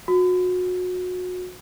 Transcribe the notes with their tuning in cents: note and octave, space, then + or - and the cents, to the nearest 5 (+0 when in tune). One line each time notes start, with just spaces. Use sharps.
F#4 -30